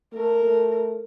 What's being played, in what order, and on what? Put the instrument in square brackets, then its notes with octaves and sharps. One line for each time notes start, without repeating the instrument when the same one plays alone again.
[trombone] A3 [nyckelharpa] A#4
[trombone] A3